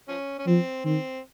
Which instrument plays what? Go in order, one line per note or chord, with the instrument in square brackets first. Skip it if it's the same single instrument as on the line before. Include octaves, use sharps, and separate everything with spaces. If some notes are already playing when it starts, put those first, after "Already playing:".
[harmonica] F3 C#4
C#4
[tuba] F3 [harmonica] C4
[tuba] D#3 [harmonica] C4